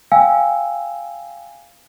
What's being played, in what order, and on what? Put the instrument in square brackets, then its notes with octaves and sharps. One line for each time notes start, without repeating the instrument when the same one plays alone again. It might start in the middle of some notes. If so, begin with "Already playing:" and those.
[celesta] F5 G5 G#5 E6